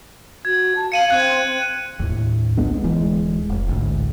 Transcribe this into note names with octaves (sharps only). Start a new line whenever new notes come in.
F#4 G#6
A5
F5 C#7 D#7 F#7
C4 F#6 G#6
D#2 A2
A#1 G#3 B3 D4
D1 E3 G#3
F1
A1 D2 G#2